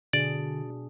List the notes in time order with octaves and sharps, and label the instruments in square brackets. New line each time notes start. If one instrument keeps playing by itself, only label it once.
[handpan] B2 D4 G#4 [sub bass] D3 [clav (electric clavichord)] D5